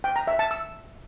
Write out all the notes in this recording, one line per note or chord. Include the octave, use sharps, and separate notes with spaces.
G5
A#5
E5
A5
E6